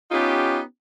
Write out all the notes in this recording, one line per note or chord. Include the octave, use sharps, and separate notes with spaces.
B3 C#4 D#4 F4 G4